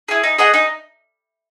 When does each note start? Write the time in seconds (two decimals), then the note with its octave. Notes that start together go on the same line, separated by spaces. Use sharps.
0.09 E4 G#4
0.24 D#4
0.38 G#4 D#5 F#5
0.54 D#4